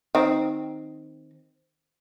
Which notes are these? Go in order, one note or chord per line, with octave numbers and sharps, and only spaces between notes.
D#3 C4